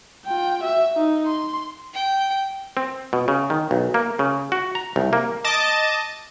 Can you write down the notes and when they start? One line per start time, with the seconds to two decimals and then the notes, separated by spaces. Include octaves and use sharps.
0.26 F4 G5
0.63 F#4 E5
0.96 D#4
1.26 C6
1.94 G5
2.77 C4
3.13 B2
3.28 C#3
3.50 D#3
3.71 B1
3.94 A#3
4.19 C#3
4.52 F#4
4.75 A#5
4.96 C2
5.13 A#3
5.44 D#5 A5 D6